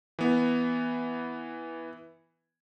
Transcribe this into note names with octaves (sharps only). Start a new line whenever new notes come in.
E3 B3